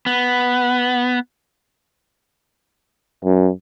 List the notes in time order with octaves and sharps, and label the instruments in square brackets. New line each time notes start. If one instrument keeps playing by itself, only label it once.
[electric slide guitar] B3
[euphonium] F#2